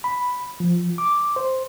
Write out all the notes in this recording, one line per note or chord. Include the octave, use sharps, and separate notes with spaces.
B5
F3
D6
C5